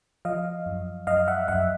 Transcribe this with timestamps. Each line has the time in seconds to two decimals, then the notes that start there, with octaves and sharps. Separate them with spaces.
0.25 F3 D#5 F5
0.66 F#2
1.07 F#2 D#5 F5
1.28 E5 F#5
1.48 F#2 E5 F#5